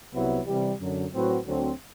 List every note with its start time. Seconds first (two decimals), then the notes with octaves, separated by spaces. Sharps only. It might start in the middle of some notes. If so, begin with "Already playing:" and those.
0.13 C2 C3 F#3 B3 E4
0.46 C3 E3 G3
0.79 F#2 D3 F#3
1.12 A2 F#3 C4 F#4 B4
1.45 D2 D3 F#3 C4